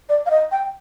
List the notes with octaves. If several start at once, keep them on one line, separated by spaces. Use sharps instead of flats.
D5
F5
D#5
G5